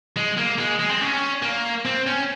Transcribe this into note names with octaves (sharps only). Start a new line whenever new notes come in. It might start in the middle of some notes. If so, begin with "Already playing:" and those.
G#3
A#3
G#3
G#3
C4
C#4
A#3
C4
C#4